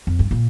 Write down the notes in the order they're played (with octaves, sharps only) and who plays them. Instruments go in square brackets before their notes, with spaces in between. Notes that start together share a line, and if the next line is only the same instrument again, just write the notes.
[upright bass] F2
G2
A#2